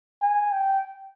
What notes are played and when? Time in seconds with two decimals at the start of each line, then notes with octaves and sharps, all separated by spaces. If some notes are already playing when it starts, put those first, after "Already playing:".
0.22 G#5
0.52 G5